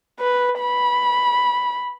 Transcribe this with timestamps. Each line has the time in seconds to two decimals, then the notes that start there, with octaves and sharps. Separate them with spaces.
0.20 B4
0.60 B5